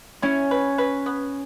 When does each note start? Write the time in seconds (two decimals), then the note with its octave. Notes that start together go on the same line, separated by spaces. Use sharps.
0.22 C#4 E4
0.51 B4
0.78 B4
1.06 B3